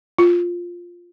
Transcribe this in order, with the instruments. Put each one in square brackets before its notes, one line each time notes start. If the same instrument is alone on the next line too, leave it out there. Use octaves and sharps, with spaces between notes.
[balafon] F4